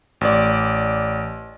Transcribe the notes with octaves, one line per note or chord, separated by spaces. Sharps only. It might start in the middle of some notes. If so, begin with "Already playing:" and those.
A1 D5